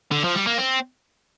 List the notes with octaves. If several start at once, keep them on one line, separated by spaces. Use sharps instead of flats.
D3
F3
G3
A#3
C4